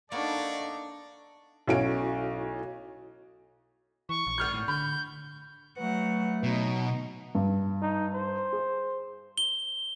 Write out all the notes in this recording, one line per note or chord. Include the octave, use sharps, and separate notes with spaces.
A#3 B3 D4 D#4 A4 D5 C#6
B1 C#4 E4 F#4 A4 D7
E3 C#6
A#1
G#1 F6 G6
A2
D3 B5 G6
F#3 A3 B4 F#5
B2 F#3 D#4
G2
D#4
C5
G#4
G7